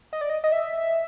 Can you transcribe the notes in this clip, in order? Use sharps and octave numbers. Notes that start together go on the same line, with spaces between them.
D#5
D5
D#5
D#5
E5